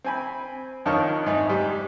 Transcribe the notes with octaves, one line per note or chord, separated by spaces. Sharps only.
C4 G#5 B5
F2 D#3 C#5 D#5 A5 F6
G#2 D#4
G#2 G3